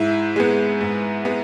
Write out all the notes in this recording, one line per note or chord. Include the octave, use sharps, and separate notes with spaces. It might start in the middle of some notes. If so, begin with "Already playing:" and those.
Already playing: G#2 E4
G#3 B3
G#2
G#3 B3